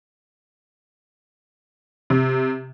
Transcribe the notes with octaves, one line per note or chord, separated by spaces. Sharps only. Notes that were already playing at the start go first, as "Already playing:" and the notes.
C3